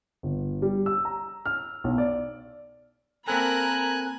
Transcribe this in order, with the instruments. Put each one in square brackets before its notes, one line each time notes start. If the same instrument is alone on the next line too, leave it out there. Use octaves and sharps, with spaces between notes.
[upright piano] G1
G3
E6
A#5
F6
B1
D5
[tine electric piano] A#3 C4 A4 [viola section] A#4 A#5 B5 [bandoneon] G#5 F#6